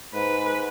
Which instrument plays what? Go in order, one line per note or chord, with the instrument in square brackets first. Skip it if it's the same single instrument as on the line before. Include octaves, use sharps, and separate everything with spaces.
[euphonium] G#2 [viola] B4